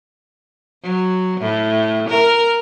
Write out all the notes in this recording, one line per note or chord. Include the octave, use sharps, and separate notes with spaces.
F#3
A2
A#4